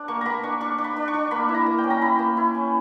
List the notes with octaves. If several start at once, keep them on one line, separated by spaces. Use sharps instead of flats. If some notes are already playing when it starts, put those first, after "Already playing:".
Already playing: D4
A#3 C#6
A#3 A#5 B5
D4 C#6
D4 C#6
D4
B5
D4
C#6
D4
A#3 B5
E4
A#5
A#3
G5
C#4
A#5
E4 B5
A#3
E4
C#4